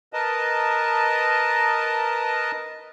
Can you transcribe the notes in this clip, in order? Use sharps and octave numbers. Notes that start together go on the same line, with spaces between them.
A#4 B4 D#5 A5